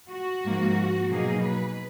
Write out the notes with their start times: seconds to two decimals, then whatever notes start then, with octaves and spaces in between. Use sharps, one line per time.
0.11 F#4
0.44 G#2 F3 A#3
1.09 B2 F#3 A#3 D#4 G#4
1.43 B4